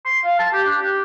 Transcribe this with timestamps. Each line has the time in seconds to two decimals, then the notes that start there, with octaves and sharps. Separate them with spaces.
0.05 C6
0.25 F5
0.39 A5
0.53 G4
0.67 D4
0.81 G4